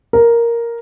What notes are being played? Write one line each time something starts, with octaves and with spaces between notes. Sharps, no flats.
A#4